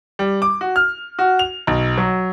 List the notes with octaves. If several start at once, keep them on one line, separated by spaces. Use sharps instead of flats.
G3
D6
F#4
F6
F#4
F7
B1
F#3